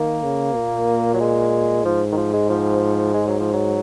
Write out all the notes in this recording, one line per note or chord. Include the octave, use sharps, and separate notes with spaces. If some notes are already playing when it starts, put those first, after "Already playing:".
Already playing: D#3 A#3
C#3
A#2
F#3
G#3
G#2 F3
D#3
F3
G#3
F3
G#3
F#3
F3
F#3